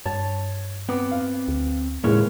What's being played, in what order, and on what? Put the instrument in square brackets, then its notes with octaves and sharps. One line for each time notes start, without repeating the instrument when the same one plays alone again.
[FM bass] G2 [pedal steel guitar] C#5 [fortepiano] A5
[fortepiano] B3 [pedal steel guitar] C4 D6
[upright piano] F5
[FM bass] D2
[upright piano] D#2 G#3 [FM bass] A2 [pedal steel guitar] C#3 C#4 C#5 [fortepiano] E3